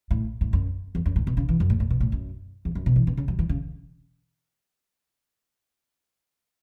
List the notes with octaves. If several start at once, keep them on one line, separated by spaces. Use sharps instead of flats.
A2
A2
F#2
E2
F#2
A2
B2
C#3
E3
F#2
A2
A2
B2
A2
F#2
E2
F#2
B2
E3
B2
C#3
F#3
E3
C#3